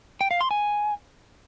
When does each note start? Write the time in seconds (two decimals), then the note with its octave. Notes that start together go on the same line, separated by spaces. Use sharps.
0.21 G5
0.31 F5
0.41 C6
0.51 G#5